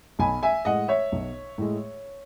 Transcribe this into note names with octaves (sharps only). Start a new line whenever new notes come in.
B1 G#5 B5
E5 G#5
A2 G#3 D#5 F#5
C#5 E5
B1
A2 G#3